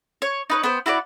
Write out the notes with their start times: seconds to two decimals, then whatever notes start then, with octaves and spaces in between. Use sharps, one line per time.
0.22 C#5
0.50 D#4 B4 C#5
0.64 B3 C5 G5
0.86 E4 F#4 A4 D5